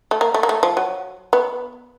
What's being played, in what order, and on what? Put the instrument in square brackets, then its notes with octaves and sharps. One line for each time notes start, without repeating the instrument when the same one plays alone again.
[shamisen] A3
A#3
A3
A#3
A3
F3
F#3
B3